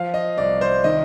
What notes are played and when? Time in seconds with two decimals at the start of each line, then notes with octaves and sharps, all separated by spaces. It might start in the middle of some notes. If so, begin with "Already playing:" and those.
Already playing: F3 F5
0.14 D#5
0.38 C2 D5
0.61 C5
0.84 D#3 D#5